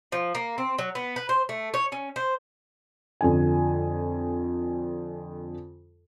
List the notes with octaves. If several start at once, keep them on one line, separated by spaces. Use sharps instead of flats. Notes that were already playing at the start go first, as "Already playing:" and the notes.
F3
A#3
C4
F#3
B3
B4
C5
A3
C#5
C#4
C5
F2 D3 G#5